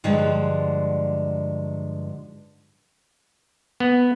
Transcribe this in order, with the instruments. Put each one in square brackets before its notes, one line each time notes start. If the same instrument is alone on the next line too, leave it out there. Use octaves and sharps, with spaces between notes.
[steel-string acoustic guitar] G2 D3 F3 F#3 G#3
[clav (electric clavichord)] B3